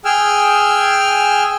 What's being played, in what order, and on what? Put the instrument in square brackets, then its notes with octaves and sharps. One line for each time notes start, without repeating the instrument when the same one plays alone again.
[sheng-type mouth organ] G#4 G5 G#5 E6 F6